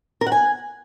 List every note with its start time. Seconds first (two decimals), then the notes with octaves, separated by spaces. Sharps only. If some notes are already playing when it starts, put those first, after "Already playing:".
0.21 A#4
0.27 F#5
0.32 G#5